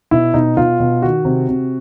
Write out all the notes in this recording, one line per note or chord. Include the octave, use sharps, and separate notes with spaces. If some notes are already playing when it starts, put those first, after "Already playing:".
B2 E4
B2 D#4
B2 F4
B2
D#3 F#4
C3
C3